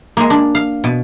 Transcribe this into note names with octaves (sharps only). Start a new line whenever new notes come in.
G#3 A#3
D4
F5
B2